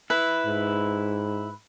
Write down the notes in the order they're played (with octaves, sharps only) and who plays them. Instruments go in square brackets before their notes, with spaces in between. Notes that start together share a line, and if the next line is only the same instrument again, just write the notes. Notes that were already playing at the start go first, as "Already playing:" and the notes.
[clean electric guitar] E4 [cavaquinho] B4
[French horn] G#2